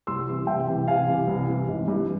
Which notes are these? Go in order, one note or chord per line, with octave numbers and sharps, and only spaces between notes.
C2 C6 E6
C3 E3
C2 E5 G5
C3 E3
C2 F5 G#5
C3 E3
C2
C3 E3
G#1
G2 E3